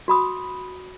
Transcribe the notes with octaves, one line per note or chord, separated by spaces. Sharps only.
F#4 B5 D#6